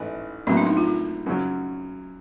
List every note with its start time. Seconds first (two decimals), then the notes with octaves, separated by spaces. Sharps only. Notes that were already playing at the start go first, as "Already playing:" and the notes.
Already playing: A1 G#2 E3 A3
0.47 B1 A2 F#3 A#3 C4
0.57 D4
0.67 D#4
0.77 F4
0.87 F4
1.26 F#2 C#3 F#3